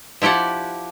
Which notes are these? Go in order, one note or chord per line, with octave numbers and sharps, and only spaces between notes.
F3 E4 G4 D5 F#5